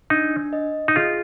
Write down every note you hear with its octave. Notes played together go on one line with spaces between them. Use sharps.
D4 D#4
D#5
D#4
F4 G#4